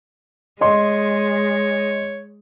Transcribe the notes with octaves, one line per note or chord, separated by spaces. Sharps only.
G#3 C#5 D#5 C6